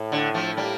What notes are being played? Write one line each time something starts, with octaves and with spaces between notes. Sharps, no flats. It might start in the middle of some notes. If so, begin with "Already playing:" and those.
Already playing: A2
D3
F3 A3
G3 A#3